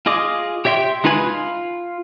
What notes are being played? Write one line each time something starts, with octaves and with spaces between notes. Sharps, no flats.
F4 G#4 D#5 D6
G4 C#5 E5 G5 C6
G#3 D#4 F4 B4 G#5
F4